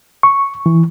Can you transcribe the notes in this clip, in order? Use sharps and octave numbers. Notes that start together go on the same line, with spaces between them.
C#6
E3